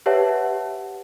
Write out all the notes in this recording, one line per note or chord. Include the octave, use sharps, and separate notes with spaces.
G4 B4 C#5 E5 F#5 A5